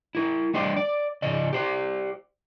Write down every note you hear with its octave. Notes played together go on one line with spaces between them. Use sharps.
E4 A#4
G3 D4 C5 D5 D#5 G5
D5
C#3 D5 D#5
G4 C5 D5